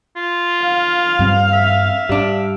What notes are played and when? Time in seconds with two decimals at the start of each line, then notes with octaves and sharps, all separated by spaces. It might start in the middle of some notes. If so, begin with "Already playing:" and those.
0.16 F4
0.63 F5
1.19 G2 G3 C4
1.53 E5
2.09 G#2 G3 D4